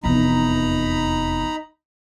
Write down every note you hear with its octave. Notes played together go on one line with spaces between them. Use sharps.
F1 E2 D#4 A#5 B5